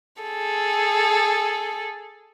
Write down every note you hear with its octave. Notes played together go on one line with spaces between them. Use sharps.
G#4 A4